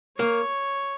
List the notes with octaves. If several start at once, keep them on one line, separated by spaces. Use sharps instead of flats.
A#3 C#5